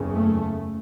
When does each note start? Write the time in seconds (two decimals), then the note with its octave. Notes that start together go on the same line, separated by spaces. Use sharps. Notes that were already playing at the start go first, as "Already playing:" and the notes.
Already playing: F#1 E2 C#3
0.13 A3